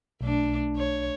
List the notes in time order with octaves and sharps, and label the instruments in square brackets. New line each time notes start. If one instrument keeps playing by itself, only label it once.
[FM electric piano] B1 [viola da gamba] A3 D4
[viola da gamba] C#5